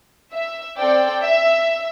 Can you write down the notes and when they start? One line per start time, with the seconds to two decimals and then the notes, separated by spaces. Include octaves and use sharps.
0.34 E5
0.78 C4 A4 D5 G5
1.23 E5